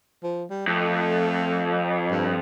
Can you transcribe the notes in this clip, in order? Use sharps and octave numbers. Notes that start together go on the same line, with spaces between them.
F3
G3
F2 A3
G2